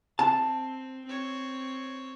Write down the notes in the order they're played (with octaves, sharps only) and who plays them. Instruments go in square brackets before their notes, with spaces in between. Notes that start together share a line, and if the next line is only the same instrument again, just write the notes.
[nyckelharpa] C4 [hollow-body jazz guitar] A5
[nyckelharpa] C4 C#5